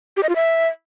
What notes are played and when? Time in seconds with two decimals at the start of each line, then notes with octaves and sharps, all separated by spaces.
0.17 G4
0.23 D#5
0.29 F4
0.36 E5